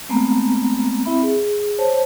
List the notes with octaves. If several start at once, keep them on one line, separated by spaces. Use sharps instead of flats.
G#3 A3 B3 C4 A#5
C4 E4 E5 B5
G#4
C5 C#5 A5